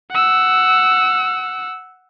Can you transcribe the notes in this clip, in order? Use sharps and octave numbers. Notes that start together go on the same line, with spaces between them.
F#5 E6